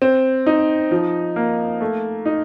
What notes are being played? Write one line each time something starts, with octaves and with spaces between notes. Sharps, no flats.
C4
D#4
F3
A#3
A3
D#4